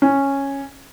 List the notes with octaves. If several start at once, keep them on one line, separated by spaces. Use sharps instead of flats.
C#4